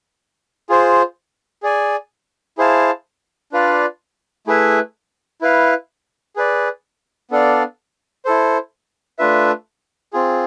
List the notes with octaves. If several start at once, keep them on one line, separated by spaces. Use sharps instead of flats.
F4 G#4 C5
G#4 D5 G#5
E4 G#4 C5 F5 A5
D4 F4 B4 D5 F5
A3 E4 G#4 B4 E5
E4 B4 F5
G#4 B4 D5
B3 D4 A4 D5 F5
E4 A4 C5
A3 D4 F4 B4 E5
C4 F4 G#4